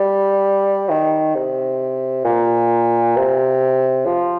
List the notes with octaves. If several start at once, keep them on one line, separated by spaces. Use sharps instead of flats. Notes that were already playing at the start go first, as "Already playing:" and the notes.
Already playing: G3
D#3
C3
A#2
C3
F3